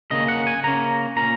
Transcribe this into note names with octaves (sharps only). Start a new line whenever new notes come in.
C#3 A#3 C#4 D#5
F#5
G#5
C#3 A#3 C#4 A#5
A#2 A#3 C#4 A#5